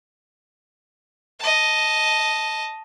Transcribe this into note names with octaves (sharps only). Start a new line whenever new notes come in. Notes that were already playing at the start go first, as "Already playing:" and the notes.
D#5 A5